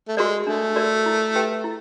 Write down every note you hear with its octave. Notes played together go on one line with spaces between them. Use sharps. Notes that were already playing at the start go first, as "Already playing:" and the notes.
A3
G#3 F#4 A#4 D5
A3 D4
F#4 A#4 D5
E4
G4 B4 E5 G5
E4